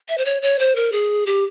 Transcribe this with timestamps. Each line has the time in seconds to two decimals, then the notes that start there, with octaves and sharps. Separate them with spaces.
0.09 E5
0.18 C5
0.25 C#5
0.42 C#5
0.59 C5
0.76 A#4
0.92 G#4
1.26 G4